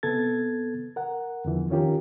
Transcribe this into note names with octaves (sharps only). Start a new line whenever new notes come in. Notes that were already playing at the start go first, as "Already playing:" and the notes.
C3 B3 A4 G#6 A6
A#4 F#5
E2 D3 E3 F3
D#3 C#4 F4 G4 A#4